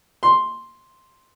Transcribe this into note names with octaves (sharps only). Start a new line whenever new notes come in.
C6